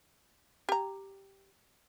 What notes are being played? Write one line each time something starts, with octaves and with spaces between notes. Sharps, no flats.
G4 A#5